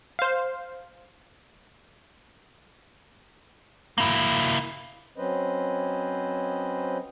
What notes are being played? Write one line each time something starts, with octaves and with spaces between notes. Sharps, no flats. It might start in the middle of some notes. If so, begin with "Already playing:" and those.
C5 F5
A#3 E4
F#3 C4 C#4 B4 C5 D#5